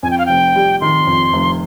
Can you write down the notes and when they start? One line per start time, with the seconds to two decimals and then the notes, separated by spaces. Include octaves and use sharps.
0.03 F2 G#5
0.11 G5
0.18 F5
0.26 F1 G5
0.56 G3
0.81 D#3 C6
1.07 F2
1.33 F1